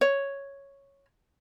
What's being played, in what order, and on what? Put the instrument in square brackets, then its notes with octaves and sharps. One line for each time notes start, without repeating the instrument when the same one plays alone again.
[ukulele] C#5